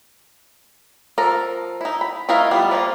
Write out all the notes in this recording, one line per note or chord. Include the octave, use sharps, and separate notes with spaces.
F3 A4 A#4
D#4 E4
B5
A3 E4 A#4 D#5 F5
G3 B3 F4
F3 A#3 F4